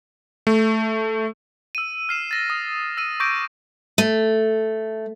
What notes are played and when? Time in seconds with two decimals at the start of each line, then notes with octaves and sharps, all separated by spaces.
0.47 A3
1.75 E6 D#7
2.09 F6 C7 E7
2.31 A6 A#6
2.50 D#6
2.97 E6 A#6 D#7
3.20 C#6 D6 G6 A#6 D7
3.98 A3